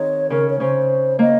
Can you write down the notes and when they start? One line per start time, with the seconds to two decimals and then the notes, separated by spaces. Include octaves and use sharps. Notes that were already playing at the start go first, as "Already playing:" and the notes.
Already playing: D#3 C4 D#4 G#4 C#5
0.30 C#3 C#4 A#4
0.50 C#5
0.60 C#3 C#4 C5
1.19 A#3 D#5